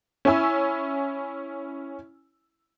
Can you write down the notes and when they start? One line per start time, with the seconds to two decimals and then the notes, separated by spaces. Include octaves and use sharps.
0.25 C#4 E4 G#5 E6